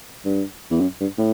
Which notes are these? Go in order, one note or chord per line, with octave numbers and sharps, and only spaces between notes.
G2
E2
F#2
G2
A2